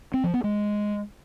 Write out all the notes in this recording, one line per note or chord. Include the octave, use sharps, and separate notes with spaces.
C4
F3
B3
G#3